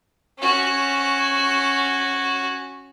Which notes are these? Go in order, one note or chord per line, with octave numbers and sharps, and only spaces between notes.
C#4 F#4